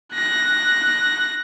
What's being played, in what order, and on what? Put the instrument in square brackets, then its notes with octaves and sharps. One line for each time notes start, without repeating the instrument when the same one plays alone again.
[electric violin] F#6 A#6